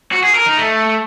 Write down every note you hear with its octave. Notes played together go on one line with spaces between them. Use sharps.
F#4
G#4
A#4
D#4
A3